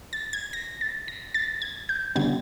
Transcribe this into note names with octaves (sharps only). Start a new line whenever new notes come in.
A6
G#6
A#6
A6
A#6
A6
G#6
G6
D3 G3 B3 G#6